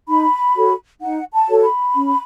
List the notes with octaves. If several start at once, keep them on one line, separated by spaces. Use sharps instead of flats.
D#4 B5
F#4 A4 C#5
D#4 F#5
A5
F#4 A4 C#5
B5
C#4